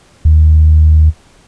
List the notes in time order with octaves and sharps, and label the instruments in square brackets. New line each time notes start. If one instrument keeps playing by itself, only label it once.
[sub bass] D#2